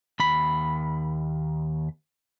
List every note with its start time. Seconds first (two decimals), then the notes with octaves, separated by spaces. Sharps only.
0.20 D#2 B5